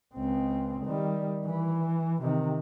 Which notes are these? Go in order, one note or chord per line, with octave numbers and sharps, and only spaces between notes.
C#2 C4
D#3 G3
E3
C3 D#3